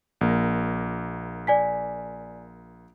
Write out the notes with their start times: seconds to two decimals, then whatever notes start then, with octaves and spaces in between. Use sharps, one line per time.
0.21 A#1 A#3
1.47 D5 G#5 B6